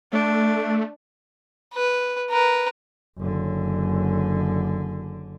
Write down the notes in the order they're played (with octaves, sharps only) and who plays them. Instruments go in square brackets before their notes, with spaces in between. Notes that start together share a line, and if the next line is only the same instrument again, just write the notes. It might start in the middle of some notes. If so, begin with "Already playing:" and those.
[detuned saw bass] A3 [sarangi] D4
[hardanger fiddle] B4
A#4 B4
[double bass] F#1 D3